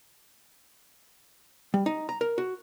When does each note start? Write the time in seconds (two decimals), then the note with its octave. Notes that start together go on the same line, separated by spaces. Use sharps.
1.74 G3
1.86 D#4
2.09 A#5
2.21 A#4
2.38 F#4